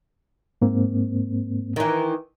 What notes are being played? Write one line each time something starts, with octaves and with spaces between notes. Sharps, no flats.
G#2 A#3 C4
D#3 E3